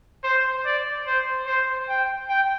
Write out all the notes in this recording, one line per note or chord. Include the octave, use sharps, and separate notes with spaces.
C5
D5
C5
C5
G5
G5